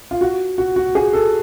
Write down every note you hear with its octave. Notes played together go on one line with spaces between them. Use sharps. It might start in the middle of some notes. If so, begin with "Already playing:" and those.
F4
F#4
F#4
F#4
G#4
A4